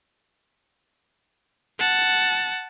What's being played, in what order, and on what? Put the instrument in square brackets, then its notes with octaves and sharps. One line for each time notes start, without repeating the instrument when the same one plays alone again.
[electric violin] F#5 A5